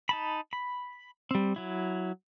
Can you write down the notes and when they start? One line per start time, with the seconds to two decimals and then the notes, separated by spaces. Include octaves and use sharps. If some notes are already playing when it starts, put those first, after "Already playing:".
0.09 D#4 A5 B5
0.53 B5
1.31 G3 C4
1.56 F#3 E4